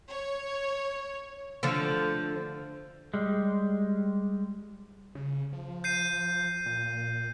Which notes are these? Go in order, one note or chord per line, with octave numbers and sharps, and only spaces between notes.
C#5
D3 F3 A3
G3 G#3
C#3
F3
G6 C7 D#7
A#2